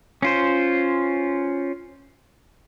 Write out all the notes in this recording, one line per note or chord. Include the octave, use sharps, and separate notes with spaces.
C#4 F4 C5